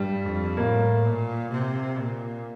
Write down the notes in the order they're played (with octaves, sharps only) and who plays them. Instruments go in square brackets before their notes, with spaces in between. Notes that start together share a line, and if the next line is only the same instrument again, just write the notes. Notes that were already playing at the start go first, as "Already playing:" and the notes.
Already playing: [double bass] G2 [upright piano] G3
[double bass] F2
[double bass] A2 [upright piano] A#3
[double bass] A#2
C3
A#2